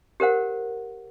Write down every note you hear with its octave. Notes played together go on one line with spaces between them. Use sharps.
G4 A#4 C5 F#5